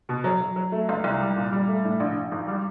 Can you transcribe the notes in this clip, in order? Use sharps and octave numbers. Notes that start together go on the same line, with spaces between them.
B2
F#3
F#3
F#3
A3
C#2
C2
G3
A#2
G3
A3
A2
A#1
A#1
G#1
G3